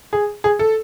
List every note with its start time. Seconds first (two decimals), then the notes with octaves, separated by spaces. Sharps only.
0.13 G#4
0.44 G#4
0.59 A4